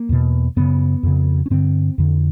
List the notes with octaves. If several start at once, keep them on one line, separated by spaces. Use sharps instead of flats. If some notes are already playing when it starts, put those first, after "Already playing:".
Already playing: A#3
E2 B2
F#2 C#3 B3
F2 C#3
C#4
G2 D3 C4
F2 D3